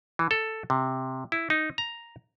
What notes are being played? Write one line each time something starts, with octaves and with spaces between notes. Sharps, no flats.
E3
A4
C3
E4
D#4
A#5